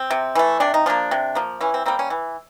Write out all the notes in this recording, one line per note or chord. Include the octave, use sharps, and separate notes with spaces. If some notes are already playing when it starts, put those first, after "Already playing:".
Already playing: C4
C3
E3 A3
C3 D4
D#4
F3 A#3 D4
C3
F3 A#3
E3 C#4
C4
G3 A#3 C4
C#4
E3